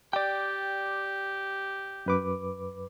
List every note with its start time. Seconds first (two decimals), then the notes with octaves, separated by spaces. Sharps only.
0.13 G4 D5 G5
2.06 F#2 B4 D6